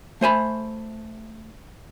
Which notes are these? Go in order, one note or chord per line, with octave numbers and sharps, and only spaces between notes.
A3 C5 G#5 B5